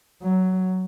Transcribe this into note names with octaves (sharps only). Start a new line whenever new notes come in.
F#3